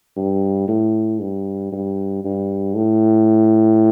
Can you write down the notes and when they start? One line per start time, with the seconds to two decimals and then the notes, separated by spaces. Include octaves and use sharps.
0.16 G2
0.68 A2
1.21 G2
1.72 G2
2.24 G2
2.76 A2